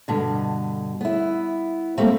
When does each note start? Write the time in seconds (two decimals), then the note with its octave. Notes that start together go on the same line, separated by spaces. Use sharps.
0.08 G2 B2 D3
1.01 B3 E4
1.98 G3 A3 A#3 C4